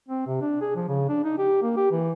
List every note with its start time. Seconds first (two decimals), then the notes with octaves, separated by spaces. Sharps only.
0.09 C4
0.27 C3
0.41 D4
0.61 G#4
0.75 F3
0.88 C#3
1.09 D4
1.24 D#4
1.38 G4
1.62 A#3
1.77 G4
1.92 E3